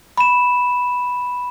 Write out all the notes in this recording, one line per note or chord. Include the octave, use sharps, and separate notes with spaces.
B5 E7